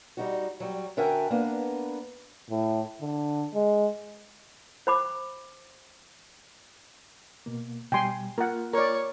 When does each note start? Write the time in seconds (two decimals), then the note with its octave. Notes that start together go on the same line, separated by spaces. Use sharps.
0.17 G3 D#4 F#4
0.60 F#3 G3
0.97 D3 F#4 A#4 E5 G5 G#5
1.30 A#3 B3 D4
2.50 A2
3.01 D3
3.54 G#3
4.87 C5 B5 D6
7.46 B2 A#3
7.92 B2 G3 G5 G#5 C6
8.38 A#3 F4 A#4 F#5
8.74 A#4 C#5 D5